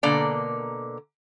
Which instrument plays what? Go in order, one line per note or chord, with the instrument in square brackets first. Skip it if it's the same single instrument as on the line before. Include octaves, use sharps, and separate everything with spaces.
[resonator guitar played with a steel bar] B2 D3 A#3 A#4 D5 A5